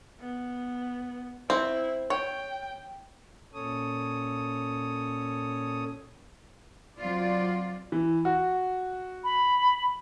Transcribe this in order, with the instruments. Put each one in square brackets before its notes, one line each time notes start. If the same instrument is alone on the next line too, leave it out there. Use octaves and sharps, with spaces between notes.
[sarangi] B3
[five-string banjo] C4 [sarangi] E4
[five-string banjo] C#5 [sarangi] G5
[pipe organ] A#2 C#4 A4 C#5 D#6
[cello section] F#3 C4 F4 D5
[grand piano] E3
F#4
[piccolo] B5